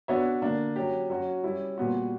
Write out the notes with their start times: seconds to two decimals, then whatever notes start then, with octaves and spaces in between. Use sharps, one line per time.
0.08 B3 D4 F#4 C#5 E5
0.42 D3 A#3 D4
0.76 F#3 C#4 G4
1.10 F#3 C#4 F#4
1.43 G3 C#4 E4
1.78 A#2 G3 B3 F#4